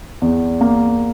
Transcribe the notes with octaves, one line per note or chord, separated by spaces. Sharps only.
E2
A#3